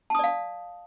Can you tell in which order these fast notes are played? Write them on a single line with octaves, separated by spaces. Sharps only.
A5 D#6 D5 F5